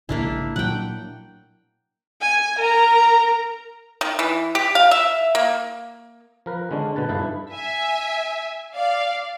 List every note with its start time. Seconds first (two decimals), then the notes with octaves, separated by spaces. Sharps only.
0.09 A#1 G#2 C#3 A#3 D4 E4
0.56 A#2 F#3 D4 F#5 G5
2.21 G#5
2.58 A#4 A#5
4.01 D#3
4.19 E3
4.55 G4
4.75 F5
4.91 E5
5.35 A#3
6.46 F3 A#4 B4
6.71 D3 G#3 C#4 D4
6.96 B2 D3 B4 A5
7.09 G2 D#4 E4 A4 B4 F5
7.53 E5 G#5
8.75 D5 F5